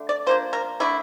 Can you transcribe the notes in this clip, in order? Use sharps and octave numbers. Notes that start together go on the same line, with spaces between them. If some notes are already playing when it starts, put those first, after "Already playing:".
Already playing: D3 A3 D4
D5
F3 A#3 D4 C5
A#4
D3 A3 D4 E4